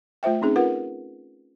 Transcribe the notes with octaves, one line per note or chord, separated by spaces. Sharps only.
A3 F4 C5 E5 G5
C4 C#4 D#4 G#4
F4 A#4 B4 F#5